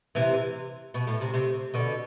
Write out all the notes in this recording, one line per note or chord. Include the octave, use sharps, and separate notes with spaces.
C3 E3
B2
A2
C3
C3
B2 D3